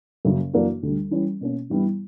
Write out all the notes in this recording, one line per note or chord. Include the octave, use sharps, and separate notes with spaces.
F#2 C#3 F#3 A#3 C#4
F#2 E3 A#3 D4 F#4
D2 D3 G3
E3 G3 C#4
B2 A#3 C#4
G2 E3 G3 B3 E4